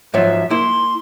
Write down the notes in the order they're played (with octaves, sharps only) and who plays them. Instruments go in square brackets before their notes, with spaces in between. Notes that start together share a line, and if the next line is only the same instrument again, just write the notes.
[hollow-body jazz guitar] G#2 F3 F#3 [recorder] E5
[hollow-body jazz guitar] A#3 E4 [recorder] C6